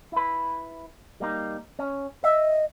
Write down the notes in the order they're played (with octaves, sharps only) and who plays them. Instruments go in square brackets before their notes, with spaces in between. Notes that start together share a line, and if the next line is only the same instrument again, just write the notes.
[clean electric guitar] E4 B4
G3 A#3 D#4
C#4
[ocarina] D#5 [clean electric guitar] E5